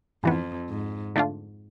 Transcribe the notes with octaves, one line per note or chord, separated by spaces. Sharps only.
F2 G#2 E3 B3
G#2
D3 A3 D4 F4